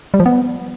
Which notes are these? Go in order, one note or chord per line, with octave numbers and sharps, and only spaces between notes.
G3
F3
B3